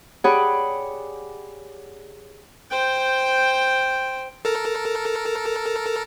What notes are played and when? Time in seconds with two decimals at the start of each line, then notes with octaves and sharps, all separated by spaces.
0.24 G4 G#4 C#5 D5 F#5 B5
2.71 C5 G5
4.45 A4 A#4